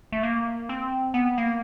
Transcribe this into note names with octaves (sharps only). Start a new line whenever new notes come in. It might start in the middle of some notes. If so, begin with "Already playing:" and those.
A3
A#3
C4
B3
A#3